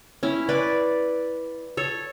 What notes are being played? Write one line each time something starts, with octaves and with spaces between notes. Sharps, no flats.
C#4 E4
B4 D5
A4 C#5